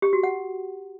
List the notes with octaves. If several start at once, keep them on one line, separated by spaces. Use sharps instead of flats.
G4
F#4
F#5